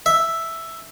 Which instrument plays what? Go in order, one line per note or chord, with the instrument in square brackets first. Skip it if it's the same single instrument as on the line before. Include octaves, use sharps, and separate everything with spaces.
[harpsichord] E5